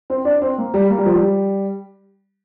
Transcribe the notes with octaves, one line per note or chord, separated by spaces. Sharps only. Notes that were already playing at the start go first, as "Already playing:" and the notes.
C4
D4
C4
A#3
G3
A#3
G3
F3
G3